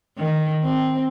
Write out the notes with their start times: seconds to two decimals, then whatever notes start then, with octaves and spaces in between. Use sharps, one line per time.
0.18 D#3
0.63 C4